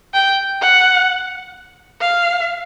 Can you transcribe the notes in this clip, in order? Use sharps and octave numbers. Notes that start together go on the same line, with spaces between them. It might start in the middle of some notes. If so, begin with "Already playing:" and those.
G5
F#5
F5